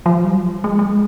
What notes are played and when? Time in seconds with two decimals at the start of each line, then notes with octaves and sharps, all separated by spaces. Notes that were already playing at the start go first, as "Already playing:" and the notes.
0.06 F3
0.24 G3
0.35 F#3
0.64 G#3
0.79 G#3